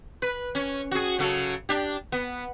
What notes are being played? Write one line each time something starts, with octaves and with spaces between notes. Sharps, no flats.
B4
C#4
F#4 G#4
C#3 F#3 A4
D4 G4
B3